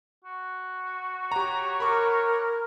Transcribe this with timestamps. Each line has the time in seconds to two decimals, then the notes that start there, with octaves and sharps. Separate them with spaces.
0.24 F#4
1.32 G4 C#5 A#5
1.80 A#4 B5 C#6 D6